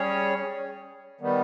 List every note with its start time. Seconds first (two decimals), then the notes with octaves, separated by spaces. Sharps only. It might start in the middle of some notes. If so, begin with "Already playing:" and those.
Already playing: G3 C#4 G#4 C#5
1.21 D#3 G3 B3